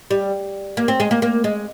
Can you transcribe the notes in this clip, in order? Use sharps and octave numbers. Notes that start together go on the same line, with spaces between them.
G3
A#3
C4
G#3
A#3
A#3
G#3